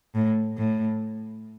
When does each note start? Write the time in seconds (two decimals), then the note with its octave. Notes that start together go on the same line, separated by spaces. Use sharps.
0.15 A2
0.58 A2